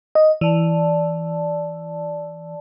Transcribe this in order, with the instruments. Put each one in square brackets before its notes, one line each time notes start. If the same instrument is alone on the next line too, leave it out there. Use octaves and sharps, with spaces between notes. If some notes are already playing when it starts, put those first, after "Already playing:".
[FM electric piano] D#5
[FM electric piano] E3 [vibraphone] D5 A5